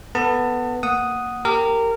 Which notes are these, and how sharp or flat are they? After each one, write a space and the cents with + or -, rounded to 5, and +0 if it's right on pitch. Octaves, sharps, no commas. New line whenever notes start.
B3 +0 A4 +20 A5 +30
A#3 +0 F#5 +0 D#6 +0
G4 +0 A#4 -20